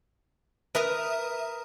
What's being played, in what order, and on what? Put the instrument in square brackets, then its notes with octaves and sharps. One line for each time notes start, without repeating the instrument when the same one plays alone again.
[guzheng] A#4 A#5 [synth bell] B4 E5 D#6